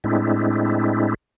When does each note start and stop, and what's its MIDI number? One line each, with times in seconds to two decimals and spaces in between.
0.04 1.14 45
0.04 1.14 56
0.04 1.14 60
0.04 1.14 62
0.04 1.14 64